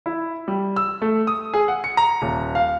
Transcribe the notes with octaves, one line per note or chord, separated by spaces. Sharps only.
E4
G3
E6
A3
D#6
G#4
F#5
C#7
A#5
D#1
F5